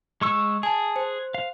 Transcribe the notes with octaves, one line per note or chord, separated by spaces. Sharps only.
G#3 C#6 E6
G#4 G#5 A5
C5
F5